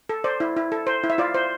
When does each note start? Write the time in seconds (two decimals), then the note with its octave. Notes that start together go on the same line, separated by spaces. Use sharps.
0.09 A4
0.24 C5 D5
0.40 E4
0.56 E4
0.72 A4
0.87 C5
1.04 E4
1.10 E5
1.18 F4 D5
1.34 C5